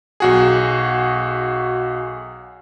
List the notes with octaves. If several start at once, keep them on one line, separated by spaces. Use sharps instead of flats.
B1 F#4 G#4